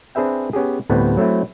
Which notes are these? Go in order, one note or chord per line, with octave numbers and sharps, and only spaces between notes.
C4 D4 G#4 B4 E5 G5
B3 C#4 G4 G#4
D2 A2 G3 B3 C4
F#3 A3 C4 E4